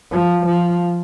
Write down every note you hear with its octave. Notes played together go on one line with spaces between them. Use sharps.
F3
F3